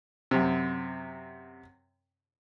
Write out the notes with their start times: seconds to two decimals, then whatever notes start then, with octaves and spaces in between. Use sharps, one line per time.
0.31 F#2 C3